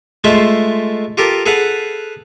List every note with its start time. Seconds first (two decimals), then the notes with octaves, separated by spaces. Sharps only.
0.24 G#3 A3 F4 C5 E5
1.17 F4 G4 A4 A#4
1.46 G#4 A4 B4 F5 F#5